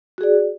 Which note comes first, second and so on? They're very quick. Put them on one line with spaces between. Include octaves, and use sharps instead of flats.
F#4 G#4 D5